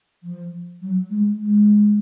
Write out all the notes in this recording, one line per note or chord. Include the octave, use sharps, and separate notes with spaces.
F3
F#3
G#3
G#3